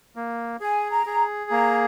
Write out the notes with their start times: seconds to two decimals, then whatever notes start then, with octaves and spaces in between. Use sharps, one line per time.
0.16 A#3
0.60 G#4 G#5
0.91 A#5
1.06 G#4
1.51 A#3 A#5